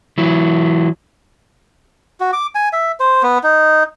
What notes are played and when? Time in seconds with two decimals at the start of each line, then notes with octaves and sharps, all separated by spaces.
0.18 E3 F#3 E4
2.20 F#4
2.33 D6
2.55 G#5
2.73 E5
3.00 C5
3.23 B3
3.43 D#4